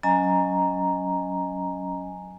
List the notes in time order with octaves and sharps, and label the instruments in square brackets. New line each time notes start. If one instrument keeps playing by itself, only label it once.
[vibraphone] F#3 C#4 D#5 G#5 A#5